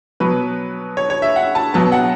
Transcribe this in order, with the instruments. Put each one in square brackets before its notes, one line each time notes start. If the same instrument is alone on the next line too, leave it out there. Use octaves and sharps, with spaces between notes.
[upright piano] B2 F#3 B3 B4
C#5
C#5
E5
F#5
A5
B2 F#3 B3 A5
F#5